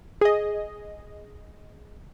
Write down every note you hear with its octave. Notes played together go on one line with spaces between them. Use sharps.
G#4 D#5